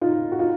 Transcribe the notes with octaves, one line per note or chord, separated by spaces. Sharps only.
D#4 F4
F#4
D#4 F4